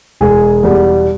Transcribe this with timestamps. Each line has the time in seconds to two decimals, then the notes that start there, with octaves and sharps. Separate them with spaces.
0.21 E1 G#4
0.63 E2 B2 G3